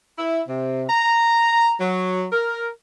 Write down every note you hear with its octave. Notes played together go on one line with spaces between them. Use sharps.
E4
C3
A#5
F#3
A#4